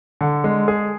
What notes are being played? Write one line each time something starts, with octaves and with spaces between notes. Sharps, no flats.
D3
G#3
G#4